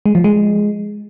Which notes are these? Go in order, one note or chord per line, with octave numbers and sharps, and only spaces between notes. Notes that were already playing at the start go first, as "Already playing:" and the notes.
G#3
F3
G#3